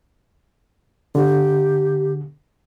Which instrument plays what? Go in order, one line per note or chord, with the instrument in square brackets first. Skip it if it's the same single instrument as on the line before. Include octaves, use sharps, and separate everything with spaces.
[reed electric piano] D3 [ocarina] G4